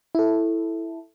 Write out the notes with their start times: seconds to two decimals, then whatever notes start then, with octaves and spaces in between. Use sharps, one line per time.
0.15 E4 A4